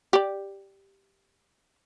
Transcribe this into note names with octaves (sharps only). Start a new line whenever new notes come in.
G4 D5